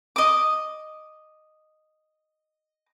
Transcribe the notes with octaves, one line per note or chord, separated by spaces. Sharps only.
D#5 D6